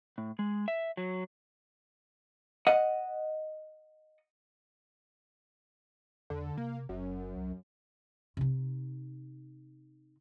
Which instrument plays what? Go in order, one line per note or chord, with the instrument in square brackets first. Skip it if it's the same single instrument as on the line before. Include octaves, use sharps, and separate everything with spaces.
[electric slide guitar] A2
G#3
E5
F#3
[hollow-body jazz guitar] D#5 F#5
[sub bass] E2 [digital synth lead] D3
[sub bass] C3 [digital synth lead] A#3
[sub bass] F#1 [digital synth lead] F#2
[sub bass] C2
[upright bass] C3 D#4